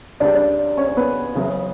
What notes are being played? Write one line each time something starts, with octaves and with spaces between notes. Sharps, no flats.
C#2 C#3 G3 D4 D5
D4 D5
C#4 C#5
C#4 C#5
B3 B4
F#1 F#2 C#3